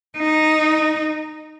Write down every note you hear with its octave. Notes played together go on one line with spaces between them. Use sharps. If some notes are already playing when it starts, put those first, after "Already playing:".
D#4